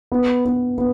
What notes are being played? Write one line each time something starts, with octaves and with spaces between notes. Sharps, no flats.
B3
B3
B3